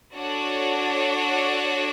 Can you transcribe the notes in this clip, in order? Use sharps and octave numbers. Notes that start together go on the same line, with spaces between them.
D4 F#4 A4 C#5 F#5